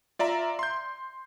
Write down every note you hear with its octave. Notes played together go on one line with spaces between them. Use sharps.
F4 D5 E5 A#5
C6 G6